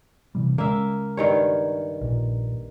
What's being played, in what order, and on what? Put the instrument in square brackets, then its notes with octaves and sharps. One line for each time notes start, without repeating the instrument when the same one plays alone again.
[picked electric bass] C3 E3 G3
[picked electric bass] C#3 G#3 C#4 [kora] A#3 E5
[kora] G2 D#3 C#5
[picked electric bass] A#1 A#2